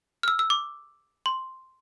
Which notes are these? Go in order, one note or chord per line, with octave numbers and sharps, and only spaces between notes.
F6
E6
E6
D6
C6